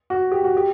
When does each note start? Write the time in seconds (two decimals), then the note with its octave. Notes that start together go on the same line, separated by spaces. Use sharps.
0.10 F#4
0.32 G4
0.44 F#4
0.57 G4